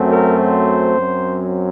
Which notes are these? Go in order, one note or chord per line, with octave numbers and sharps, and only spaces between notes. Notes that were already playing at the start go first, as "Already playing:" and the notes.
Already playing: F#2 F#3 A3 C4
A#4
C5
F#2 F#3 C4